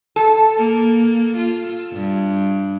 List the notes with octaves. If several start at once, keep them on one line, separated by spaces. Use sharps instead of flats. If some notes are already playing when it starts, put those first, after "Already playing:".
A4
A#3
F4
G2